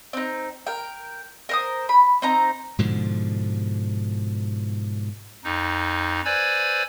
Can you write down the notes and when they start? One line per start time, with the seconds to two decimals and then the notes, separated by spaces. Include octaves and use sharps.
0.13 C4 D#4
0.67 A#4 G5
1.49 A#4 C5 D#6
1.89 B5
2.22 C4 D#4 A#5
2.79 G#2 B2 D3 F3
5.44 F2 D#4
6.25 B4 C5 D5 G#5 E6 G#6